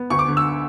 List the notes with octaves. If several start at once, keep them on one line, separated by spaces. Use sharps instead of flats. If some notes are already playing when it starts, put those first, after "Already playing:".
Already playing: B3
D2 C#6
D6
D3
E6